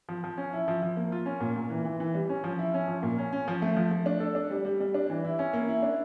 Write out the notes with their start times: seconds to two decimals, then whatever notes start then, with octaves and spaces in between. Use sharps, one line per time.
0.09 F3
0.24 F3
0.37 C#4
0.53 E4
0.68 F3
0.82 F3
0.97 A#3
1.12 F4
1.26 C#4
1.40 A#2
1.56 A#2
1.70 E3
1.85 E3
2.00 E3
2.14 G3
2.29 C#4
2.44 F3
2.59 E4
2.74 C#4
2.88 F3
3.03 A#2
3.18 C#4
3.33 C#4
3.48 F3
3.62 A3
3.77 F3
3.91 A3
4.06 D4
4.20 A4
4.35 D4
4.50 G3
4.65 G3
4.80 G3
4.94 D4
5.10 E3
5.24 E4
5.39 C#4
5.53 A#3
5.68 E4
5.82 D4